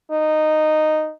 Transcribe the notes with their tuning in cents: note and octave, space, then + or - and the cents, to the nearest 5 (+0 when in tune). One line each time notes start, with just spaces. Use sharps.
D#4 -10